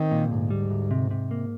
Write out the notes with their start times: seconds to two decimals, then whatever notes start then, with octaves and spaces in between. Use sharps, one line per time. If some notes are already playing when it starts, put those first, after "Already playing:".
Already playing: D#3 C4
0.11 A#2
0.31 D2 G#2
0.50 G3
0.70 D2
0.91 C3
1.11 C3
1.31 A#3